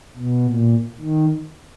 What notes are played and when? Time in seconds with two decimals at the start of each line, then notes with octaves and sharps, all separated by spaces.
0.17 B2
0.45 A#2
1.01 D#3